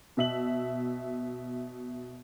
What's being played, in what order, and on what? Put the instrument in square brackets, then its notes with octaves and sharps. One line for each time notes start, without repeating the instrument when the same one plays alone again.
[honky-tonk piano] B2 E5 F#7